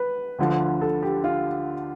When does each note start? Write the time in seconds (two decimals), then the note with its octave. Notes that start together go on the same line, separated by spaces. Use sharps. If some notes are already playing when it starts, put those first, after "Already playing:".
Already playing: B4
0.39 D2 D3 F3
0.81 A4
1.03 G4
1.24 F4